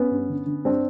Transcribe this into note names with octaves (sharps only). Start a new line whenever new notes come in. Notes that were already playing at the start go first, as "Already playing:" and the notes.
Already playing: B3 C#4
G2
D3
D3
G2 C4 D4